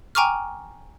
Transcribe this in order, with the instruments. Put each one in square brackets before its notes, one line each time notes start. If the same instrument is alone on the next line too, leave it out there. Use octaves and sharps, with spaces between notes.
[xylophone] G5 G#5 A#5 C#6 D6 F6